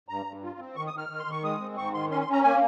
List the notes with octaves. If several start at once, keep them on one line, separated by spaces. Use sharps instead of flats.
G2 A#5
G2
F4
C4
D#3 C#6
D#6
D#3 F6
D#3
C6
D#3 C#6
G#3 D#6
C4
G#2 C#6
D#3 C6
C#4 C6
C6
C#4 A#5
A#3 G#5